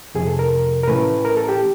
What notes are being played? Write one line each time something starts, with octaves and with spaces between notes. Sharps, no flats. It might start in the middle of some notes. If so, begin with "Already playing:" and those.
F2 C3 F3 G#4
A4
A#4
A#4
A2 E3 A3 C#4 B4
A#4
A4
G4